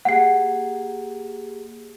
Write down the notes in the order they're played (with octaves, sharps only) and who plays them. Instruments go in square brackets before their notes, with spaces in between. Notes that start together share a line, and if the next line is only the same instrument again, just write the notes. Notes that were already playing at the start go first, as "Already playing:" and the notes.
[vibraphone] A#3 G4 G#4 [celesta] F#5 C7